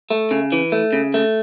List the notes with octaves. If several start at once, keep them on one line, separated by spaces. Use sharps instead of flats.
A3
C#3
E3
A3
C#3
A3